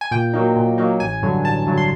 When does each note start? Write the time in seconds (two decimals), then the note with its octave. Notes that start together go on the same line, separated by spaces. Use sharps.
0.01 G#5
0.11 A#2 G5
0.34 F#3 A#3 D#4
0.56 A#2
0.78 F#3 A#3 D#4
1.00 A1 G#5
1.22 G2 D3 F#3
1.44 A1 A5
1.67 G2 D3 F#3
1.78 C6